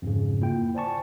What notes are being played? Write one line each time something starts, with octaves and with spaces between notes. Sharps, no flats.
F2 G#2 C#3
A#3 E4 F4 G5
C5 D5 G#5 A5 C#6